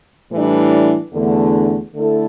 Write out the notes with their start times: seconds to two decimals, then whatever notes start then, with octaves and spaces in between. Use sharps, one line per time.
0.31 A2 E3 G3 D4
1.13 E2 D3 A3
1.93 D3 A3 E4 A4